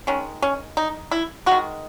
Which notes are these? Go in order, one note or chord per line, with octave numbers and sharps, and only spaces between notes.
D#3 G#3 C#4
C#4
D#4
E4
D#3 G#3 F#4